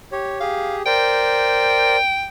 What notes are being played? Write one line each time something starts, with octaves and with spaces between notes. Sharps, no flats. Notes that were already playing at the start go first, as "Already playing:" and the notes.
G4 C#5
G4 G#4 F5
A#4 C5 D5 G5